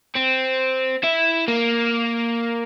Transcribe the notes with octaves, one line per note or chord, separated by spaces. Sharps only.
C4
E4
A#3